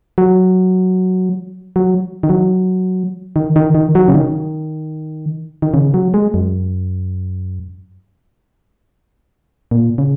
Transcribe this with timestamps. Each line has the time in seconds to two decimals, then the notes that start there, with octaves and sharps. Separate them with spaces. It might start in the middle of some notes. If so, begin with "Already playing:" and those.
0.18 F#3
1.76 F#3
2.23 D#3
2.29 F#3
3.36 D#3
3.56 D#3
3.75 D#3
3.95 F#3
4.08 C#3
4.14 D#3
5.62 D#3
5.74 C#3
5.94 F#3
6.14 G#3
6.34 F#2
9.71 A#2
9.98 C#3